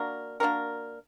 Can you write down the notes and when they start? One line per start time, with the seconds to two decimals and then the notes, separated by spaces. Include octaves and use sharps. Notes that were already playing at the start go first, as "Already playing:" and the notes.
Already playing: A#3 D4 F#4 A#4
0.40 A#3 D4 F#4 A#4